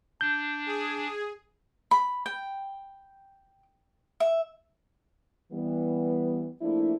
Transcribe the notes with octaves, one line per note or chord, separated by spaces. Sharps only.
D4 G6
G#4
B5
G5
E5
E3 G3 B3
F3 A3 A#3 D4 E4